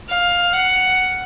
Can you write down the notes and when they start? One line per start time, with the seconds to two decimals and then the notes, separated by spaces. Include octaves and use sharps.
0.09 F5
0.53 F#5